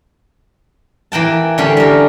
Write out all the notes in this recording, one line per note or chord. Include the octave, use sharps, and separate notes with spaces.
E3 A#3 G5 A5
D3 G3 C#4 D4
G3 A#4